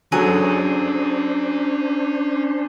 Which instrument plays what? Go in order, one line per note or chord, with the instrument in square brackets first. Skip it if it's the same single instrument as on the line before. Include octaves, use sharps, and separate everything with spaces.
[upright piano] F#3 A4 [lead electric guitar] C#4 F#5 [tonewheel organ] D4 C5 [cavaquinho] G#4